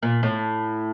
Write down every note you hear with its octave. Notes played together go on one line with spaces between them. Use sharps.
A#2
A2